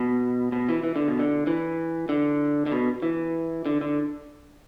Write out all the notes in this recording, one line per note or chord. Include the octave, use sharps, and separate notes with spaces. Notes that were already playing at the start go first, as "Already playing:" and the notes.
Already playing: B2
B2
E3
E3
D3
B2
D3
E3
D3
D3
B2
E3
D3
D3